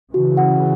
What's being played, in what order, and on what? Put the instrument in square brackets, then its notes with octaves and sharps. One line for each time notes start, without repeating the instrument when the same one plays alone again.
[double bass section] C#3 E3 [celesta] F#4
[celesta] F#5